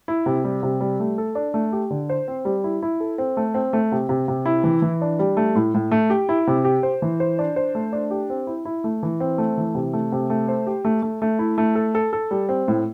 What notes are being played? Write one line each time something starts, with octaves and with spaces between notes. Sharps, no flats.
E4
C3
G3
C3
G3
A3
A4
D4
A3
G4
D3
C5
C4
G3
E4
E4
A4
C4
A3
C4
A3
C3
C3
C3
E4
E3
E3
D4
G3
A3
A2
A2
A3
G4
E4
C3
G4
C5
E3
C5
D4
C5
A3
D4
G4
C4
E4
E4
A3
E3
C4
A3
E3
C3
A3
C3
A3
C5
G4
A3
A3
A3
E4
A3
A4
A4
A4
G3
C4
A2